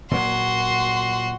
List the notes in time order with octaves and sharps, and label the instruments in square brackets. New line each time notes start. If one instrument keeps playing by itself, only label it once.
[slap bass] A#2 F#3 [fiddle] F#4 C6